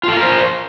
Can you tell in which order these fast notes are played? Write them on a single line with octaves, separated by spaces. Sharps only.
F4 A4 F5 A#4 C5